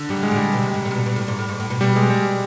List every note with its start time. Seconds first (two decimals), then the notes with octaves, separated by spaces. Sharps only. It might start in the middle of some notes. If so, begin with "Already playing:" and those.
Already playing: D3
0.09 G#2 G3
0.21 A2 G#3
0.31 A2
0.36 G3
0.53 B2
0.63 C3
0.74 G#2
0.85 A2
0.91 C3
0.95 B2
1.06 B2
1.16 A2
1.28 G#2
1.39 A2
1.49 G#2
1.60 A2
1.70 B2
1.81 B2 G3
1.96 G#3
2.10 G3